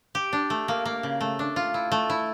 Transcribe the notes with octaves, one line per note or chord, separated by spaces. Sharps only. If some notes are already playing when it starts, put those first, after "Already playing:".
G4
D4
A3
A#3
A#3
C#3
A3
D4
F4
E4
A3
E4